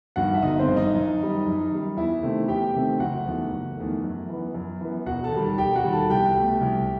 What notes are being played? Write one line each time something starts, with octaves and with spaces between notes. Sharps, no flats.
G2 D#3 F#4 F#5
E5
G1 D#4 D#5
C4 C5
G2 D#3
D#4 D#5
F#2
D#3 G3
F#2
D#3 G3
E2 E4 E5
C3 D#3 A3 C4
E2 G4 G5
C3 D#3 A3 C4
F#1 F#4 F#5
E2 D#3 A3
F#1
E2 D#3 A3
F#2
E3 B3
F#2
E3 B3
E1 F#4 F#5
A4 A5
D#2 D#3 G3
E1 G4 G5
F#4 F#5
D#2 D#3 G3
A4 A5
C2 G4 G5
B2 A3
C2